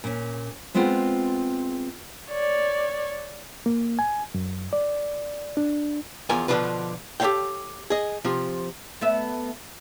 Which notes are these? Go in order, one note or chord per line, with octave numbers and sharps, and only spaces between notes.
A#2 C#4
G#3 B3 C4 F4 G#4
C#5 D5
A#3
G#5
F#2
D5
D4
E2 F3 F4 A#4 G#5
B2 D3 F3 D4 F4 B4
G4 A4 A#4 C#5 F5 G5
G#4 D#5
C3 F3 F4
A3 B3 E5